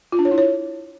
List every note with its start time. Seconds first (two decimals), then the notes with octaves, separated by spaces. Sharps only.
0.12 F4
0.19 D4
0.25 C#5
0.31 E4
0.38 C#5